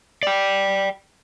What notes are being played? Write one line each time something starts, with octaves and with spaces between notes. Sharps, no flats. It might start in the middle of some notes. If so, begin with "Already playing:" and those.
D5 G5